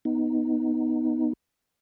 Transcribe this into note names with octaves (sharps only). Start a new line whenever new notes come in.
B3 D#4